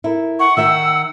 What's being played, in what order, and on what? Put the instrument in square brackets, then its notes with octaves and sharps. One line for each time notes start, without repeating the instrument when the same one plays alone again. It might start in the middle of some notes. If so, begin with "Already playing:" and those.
[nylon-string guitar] E4 A4 A#4
[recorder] F#5 [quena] C#6
[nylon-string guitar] D#3 E5 G5 [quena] E6